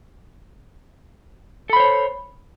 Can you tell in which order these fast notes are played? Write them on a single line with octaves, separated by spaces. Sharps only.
A4 B5 C5 C#5